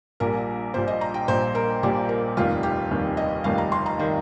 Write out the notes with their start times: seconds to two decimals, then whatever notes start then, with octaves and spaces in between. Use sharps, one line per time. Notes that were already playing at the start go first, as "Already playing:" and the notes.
0.20 A#1 A#2 G3 A#4
0.74 A#1 A#2 G3 C5
0.88 D#5
1.01 A#5
1.14 G5
1.28 A#1 A#2 G3 C5
1.55 A#4
1.83 A#1 A#2 G3 G4
2.09 A#4
2.37 F1 D#2 D#3 G3 F4
2.63 G4
2.91 F1 D#2 D#3 G3
3.17 D#5
3.44 F1 D#2 D#3 G3 F5
3.58 A#5
3.72 C6
3.86 A#5
3.99 D#3 G3